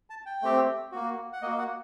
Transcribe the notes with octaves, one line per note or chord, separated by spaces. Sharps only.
A5
G5
A3 C4 G4
A#3 F#4
F#5
A#3 F#4 D#5
F#5